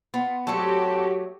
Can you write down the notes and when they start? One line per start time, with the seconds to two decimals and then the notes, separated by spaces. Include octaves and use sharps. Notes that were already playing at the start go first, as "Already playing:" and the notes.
0.14 B3 F4
0.47 F#3 A3 C4 F#4 G4 A4